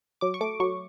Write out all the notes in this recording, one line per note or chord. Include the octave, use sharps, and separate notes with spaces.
F#3 D6
C#6
A3 D6
F#3 C#6